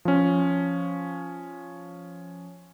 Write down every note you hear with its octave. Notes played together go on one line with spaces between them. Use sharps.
F3 C#4